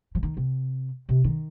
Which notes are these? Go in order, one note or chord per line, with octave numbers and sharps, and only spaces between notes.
F3
D#3
C3
C3
D#3